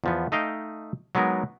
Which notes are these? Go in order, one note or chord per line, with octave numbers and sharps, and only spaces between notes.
E2 F3 B3
A3 D#4 D#5 F5 G5
F#3 G#3 B3 D#4 A#4